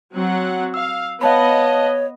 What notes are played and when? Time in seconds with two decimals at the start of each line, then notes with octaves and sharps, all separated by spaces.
0.13 F#3 C4 F#5
0.74 F5 E6
1.21 B3 C#5 D#5 F5 A5 B5